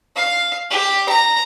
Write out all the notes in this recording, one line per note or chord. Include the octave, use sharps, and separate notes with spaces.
F5
G4
A#5